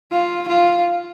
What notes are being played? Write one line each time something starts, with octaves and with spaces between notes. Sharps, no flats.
F4
F4